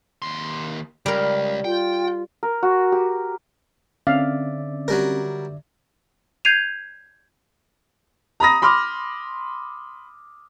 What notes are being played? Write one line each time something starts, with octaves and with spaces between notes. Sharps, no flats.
D#2 C6
C#2 G3 A#4
F4 G5
A#4
F#4
G4
D3 C4 C#4 D5 E5 F5
F#3 G3 A#4
G6 G#6 C7 D#7 F7
A#5 B5 D#6 A#6
B5 C6 D6 F6